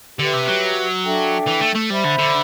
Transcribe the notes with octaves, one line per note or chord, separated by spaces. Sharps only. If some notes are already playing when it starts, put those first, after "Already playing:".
D3 G4 B4 E5
C3
F#3
D4 A4 E5 G5
E3
A3
A3
G3 C5 E5 B5
D3
D3